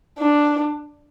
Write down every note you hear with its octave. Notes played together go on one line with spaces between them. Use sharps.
D4